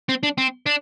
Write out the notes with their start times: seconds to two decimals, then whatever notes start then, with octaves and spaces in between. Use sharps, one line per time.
0.09 C4
0.23 D4
0.38 C4
0.66 D4